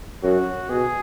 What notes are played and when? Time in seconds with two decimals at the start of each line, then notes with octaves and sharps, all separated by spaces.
0.23 F#2 F#4
0.69 B2 G#4